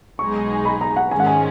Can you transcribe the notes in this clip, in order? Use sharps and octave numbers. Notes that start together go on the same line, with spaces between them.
B1 B2 G#3 D#4 G#4 C#6
B5
A#5
F#5
G#2 D#3 G#3 C#4 G#4 G#5
F#5
G#5